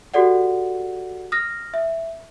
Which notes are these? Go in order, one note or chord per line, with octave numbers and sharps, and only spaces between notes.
F#4 G4 A4 D5 F#5
D#6 F6 A#6
E5